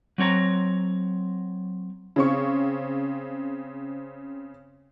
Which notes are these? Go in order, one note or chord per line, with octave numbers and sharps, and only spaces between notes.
F#3 C4 C#5 A#5
C#3 C4 C#6